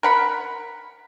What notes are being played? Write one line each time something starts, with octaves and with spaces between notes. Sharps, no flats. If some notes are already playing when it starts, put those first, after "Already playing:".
A#4 F#5 B5